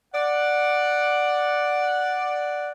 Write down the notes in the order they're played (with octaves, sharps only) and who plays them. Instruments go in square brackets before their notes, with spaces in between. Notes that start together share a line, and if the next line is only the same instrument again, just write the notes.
[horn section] D5 F#5